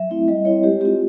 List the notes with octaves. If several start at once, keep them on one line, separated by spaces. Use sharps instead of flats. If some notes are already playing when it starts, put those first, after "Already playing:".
Already playing: F#3 E5
A3 C4 E4
G3 D#5
C4 E4 C#5
G#3 G4
C4 F4 G4